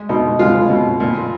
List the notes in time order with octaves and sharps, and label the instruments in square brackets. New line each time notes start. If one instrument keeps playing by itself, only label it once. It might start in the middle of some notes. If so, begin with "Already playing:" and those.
Already playing: [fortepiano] G#3
B2 D#4
G#3 F4
B2
A#2